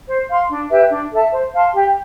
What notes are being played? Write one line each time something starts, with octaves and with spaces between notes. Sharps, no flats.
C5
F5 C6
D4
G4 B4 E5
D4
A4 E5 A5
C5
F5 A5 C6
G4